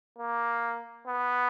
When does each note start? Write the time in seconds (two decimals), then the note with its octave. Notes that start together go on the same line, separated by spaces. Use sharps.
0.19 A#3
1.07 B3